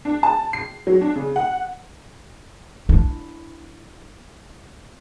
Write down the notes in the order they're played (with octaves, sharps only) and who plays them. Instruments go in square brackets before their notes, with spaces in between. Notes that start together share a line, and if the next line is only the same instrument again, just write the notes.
[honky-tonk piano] D4
A5
C7
F#3
D4
C#3
F#5
[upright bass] D4 E4